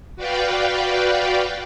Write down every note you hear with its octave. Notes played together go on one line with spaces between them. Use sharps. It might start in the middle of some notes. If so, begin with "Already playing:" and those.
F#4 B4 D5 F5 G5